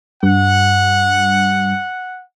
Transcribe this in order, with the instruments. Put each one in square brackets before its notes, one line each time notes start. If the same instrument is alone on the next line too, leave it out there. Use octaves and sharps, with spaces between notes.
[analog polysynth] G2 [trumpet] F#5